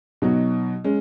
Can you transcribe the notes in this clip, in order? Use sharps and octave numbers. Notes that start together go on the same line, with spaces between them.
B2 F#3 D#4 F#4
G#3 C#4